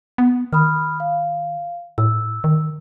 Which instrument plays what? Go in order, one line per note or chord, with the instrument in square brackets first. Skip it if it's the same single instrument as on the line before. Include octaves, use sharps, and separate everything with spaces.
[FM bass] B3
[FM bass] D#3 [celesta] B5 D#6 F6
[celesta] F5
[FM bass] A2 [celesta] E6
[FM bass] D#3